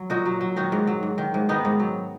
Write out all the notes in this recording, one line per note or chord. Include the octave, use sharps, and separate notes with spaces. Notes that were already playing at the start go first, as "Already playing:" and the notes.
Already playing: F#3
A#2 D#4 F#4
F#3
F#3
D#3 D#4 F#4
G#2
F#3
G#2
D#3
G#2
D#3 B3 D#4
G#2
F#3